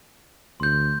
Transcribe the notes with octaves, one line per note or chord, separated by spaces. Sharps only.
D2 C6 G6